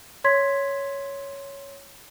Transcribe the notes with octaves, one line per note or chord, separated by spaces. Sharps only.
C#5 C6 G#6 B6